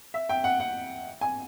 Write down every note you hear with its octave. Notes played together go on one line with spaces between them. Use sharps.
E5
G5
F#5
F#5
G#5